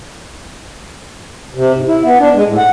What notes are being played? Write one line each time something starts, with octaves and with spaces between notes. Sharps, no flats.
C3
G#2
E4
B3
D4
G#3
A2
F#5